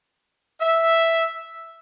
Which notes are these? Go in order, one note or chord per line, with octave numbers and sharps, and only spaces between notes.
E5